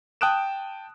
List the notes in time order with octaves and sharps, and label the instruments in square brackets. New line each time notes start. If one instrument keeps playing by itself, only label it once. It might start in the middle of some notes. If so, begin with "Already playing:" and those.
[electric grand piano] G5 A5 D#6 F#6 D7 E7